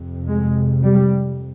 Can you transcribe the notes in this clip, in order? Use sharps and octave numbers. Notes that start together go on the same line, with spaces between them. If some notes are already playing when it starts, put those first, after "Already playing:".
Already playing: F2 C3
G#3
G3